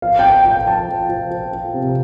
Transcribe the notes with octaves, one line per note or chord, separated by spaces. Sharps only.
F3 F5
G5
F3
G5
F3
G5
F3 A5
F3
F3
F3
F3
C3